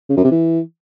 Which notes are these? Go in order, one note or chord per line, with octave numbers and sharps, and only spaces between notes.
C#3
F#2
C3
E3